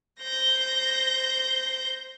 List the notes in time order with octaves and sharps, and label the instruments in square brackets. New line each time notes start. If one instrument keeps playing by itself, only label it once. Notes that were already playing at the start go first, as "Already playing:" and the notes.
[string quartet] C5 G6 A#6